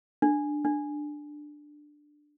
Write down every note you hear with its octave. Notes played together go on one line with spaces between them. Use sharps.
D4
D4